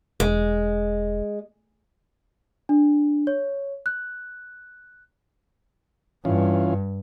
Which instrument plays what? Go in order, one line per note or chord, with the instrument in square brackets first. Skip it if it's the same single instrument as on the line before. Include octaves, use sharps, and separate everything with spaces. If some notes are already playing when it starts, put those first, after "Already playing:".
[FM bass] E1 [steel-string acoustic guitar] G#3
[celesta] D4
C#5
F#6
[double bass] G2 [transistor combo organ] E3 C#4 F4